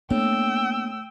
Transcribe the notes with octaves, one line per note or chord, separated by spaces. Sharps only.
A2 A#3 B3 D4 G5 E6